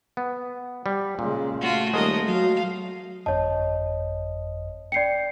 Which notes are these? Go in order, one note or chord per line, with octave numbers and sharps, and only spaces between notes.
B3
G3
A#2 C#3 G#3
A3 F4 F#4
D#1 G#3 A#4 D#5
F#3 F5
G1 F2 C#5 D#5 A5
D5 G5 G6 C7 C#7